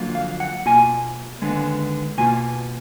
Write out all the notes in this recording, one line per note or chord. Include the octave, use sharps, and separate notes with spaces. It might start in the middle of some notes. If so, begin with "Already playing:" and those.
Already playing: F2 D3 F#3 A#3 F4
F5
F#5
B2 A#3 F4 G#5
D#2 D3 G#3 B3
B2 A#3 F4 G#5